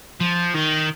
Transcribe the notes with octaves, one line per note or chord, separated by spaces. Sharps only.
F3
D#3